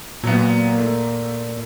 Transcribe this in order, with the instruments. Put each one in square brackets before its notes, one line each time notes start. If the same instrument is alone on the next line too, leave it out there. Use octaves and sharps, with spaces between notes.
[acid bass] A#2 [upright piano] F#3 B3 [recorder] A#3
[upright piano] A3